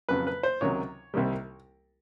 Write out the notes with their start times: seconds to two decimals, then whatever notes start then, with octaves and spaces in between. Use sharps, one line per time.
0.09 F2 C#3 F#3 B4
0.27 B4
0.43 C5
0.61 C#2 C3 D#3 F#3 C#5
1.14 C2 C3 D#3 G3